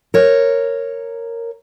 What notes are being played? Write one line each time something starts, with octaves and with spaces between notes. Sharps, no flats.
A#4 C#5